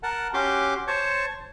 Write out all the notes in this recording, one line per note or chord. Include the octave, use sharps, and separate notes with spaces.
A#4 F#5 A5
C#4 F#4 G4 C6 D6
C5 C#5 A5 C#6